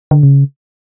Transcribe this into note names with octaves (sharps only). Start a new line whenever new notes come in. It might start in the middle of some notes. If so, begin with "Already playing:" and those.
D3
C#3